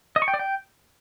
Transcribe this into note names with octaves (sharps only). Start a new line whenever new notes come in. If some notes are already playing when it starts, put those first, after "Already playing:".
D#5
C#6
G5
D5
G5